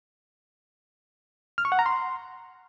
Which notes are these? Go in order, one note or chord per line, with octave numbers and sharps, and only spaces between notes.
F6
C#6
F#5
A#5
C6